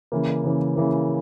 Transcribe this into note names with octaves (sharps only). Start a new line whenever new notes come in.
C#3 E3 A#3
C#3 E3 A#3
C#3 E3 A#3